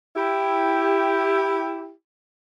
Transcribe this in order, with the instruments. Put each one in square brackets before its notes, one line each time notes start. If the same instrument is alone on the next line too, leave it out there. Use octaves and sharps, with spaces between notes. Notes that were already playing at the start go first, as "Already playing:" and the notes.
[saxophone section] E4 G4